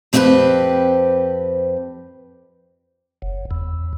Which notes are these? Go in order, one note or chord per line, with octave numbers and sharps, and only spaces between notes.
F2 C4 D#4 F#4 G4 B4
F#1
E2